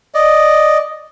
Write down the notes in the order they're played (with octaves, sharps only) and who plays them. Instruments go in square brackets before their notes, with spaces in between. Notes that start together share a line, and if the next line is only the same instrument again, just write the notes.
[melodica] D5 D#5